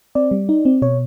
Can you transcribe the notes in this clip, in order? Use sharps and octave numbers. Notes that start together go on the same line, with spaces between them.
C4 D5
G3
D#4
C4
B2 C#5